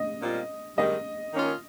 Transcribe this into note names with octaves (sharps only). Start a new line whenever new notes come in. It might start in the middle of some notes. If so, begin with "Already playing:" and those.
Already playing: D#5
A#2 G3 C4 F4
G#2 D#3 G3 D#5
D#3 A#3 C#4 F4